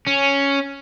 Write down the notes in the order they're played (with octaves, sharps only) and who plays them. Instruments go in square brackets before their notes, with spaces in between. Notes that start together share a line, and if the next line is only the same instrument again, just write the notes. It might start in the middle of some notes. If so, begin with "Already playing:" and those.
[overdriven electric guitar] C#4